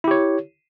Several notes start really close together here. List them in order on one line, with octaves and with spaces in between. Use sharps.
E4 G4 C#5